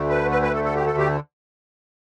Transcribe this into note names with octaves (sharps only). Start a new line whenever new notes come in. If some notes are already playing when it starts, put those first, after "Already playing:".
Already playing: D2 D3 A3
B4
B4
B4
A4
A4
G4
A4
G4